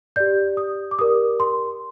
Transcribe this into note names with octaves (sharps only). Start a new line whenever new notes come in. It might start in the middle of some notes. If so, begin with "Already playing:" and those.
G4 D5 G6
D#6
D6
G4 A#4 D5 D#6
C6